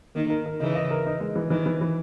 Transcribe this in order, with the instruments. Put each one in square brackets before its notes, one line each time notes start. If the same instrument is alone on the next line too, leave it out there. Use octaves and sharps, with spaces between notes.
[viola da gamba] D#3 [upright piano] A#3
[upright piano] A#4
A#4
[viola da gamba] C#3 E3 [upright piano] D#4
[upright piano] D#5
A#4
D#4
G#3
E3
[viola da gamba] D#3 [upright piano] E3
[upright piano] E3
E3